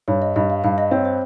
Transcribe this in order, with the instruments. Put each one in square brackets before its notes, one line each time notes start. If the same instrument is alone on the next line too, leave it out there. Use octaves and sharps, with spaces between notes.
[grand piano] G2 [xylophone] C#5
[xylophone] D#5
[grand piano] G2 [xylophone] D#5
[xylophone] F5
[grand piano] G2 [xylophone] F5
[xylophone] D#5
[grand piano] C4 [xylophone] C#5
[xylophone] C5